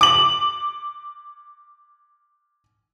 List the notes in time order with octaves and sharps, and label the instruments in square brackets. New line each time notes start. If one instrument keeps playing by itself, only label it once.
[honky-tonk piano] D6 F#7